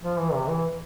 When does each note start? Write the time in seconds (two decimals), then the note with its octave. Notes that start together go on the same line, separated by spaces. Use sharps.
0.02 F3
0.19 E3
0.34 C3
0.49 E3